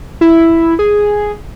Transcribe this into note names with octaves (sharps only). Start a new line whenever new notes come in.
E4
G#4